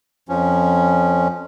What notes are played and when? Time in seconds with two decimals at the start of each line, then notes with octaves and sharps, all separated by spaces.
0.29 F2 F3 C#4